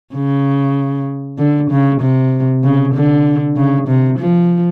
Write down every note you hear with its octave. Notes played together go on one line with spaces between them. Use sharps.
C#3
D3
C#3
C3
C#3
D3
C#3
C3
F3